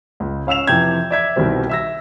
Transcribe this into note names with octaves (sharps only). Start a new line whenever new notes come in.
C#2
C#4 F5 E6 E7 F7
F2 C3 E3 G5 G6 G#6
D5 E5 G#6 B6
C2 B2 D#3 G3 C4
E5 E6 A#6